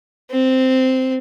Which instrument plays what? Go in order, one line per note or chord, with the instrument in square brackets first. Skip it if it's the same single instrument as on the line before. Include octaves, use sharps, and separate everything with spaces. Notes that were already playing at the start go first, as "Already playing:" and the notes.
[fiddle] C4